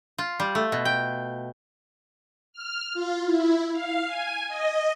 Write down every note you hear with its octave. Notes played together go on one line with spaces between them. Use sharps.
F4
G3
A3
B2
G5
F6
F4
E4
F5
G#5
D#5